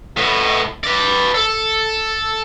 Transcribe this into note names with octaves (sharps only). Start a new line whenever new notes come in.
A2 B3
B4 D5
A4